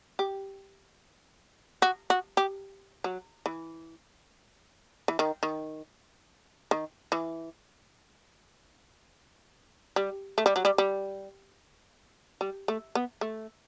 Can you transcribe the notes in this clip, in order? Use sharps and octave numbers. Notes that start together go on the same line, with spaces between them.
G4
F#4
F#4
G4
F#3
E3
E3
D#3
D#3
D#3
E3
G3
A3
G3
F#3
G3
G3
G3
A3
B3
A3